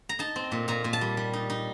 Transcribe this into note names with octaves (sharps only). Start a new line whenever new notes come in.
A#5
D#4 A5
C4
A#2
A#2 A#5
A#2
A5
G3
G3
D#4
D#4